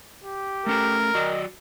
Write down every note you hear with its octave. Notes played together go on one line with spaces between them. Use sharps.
G4
A3 C#4 A4 A#4
F#3 F#4 D5 D#5